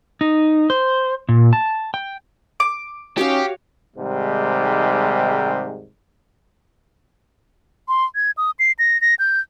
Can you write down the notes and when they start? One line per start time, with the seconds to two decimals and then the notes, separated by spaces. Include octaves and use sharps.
0.21 D#4
0.70 C5
1.29 A#2
1.53 A5
1.94 G5
2.60 D6
3.18 C#4 D#4 F#4 G4 C#5 F5
3.95 G#2 C3 D#3 G3 G#3
7.88 C6
8.15 G#6
8.37 D#6
8.59 C7
8.79 A#6
9.01 A#6
9.19 G6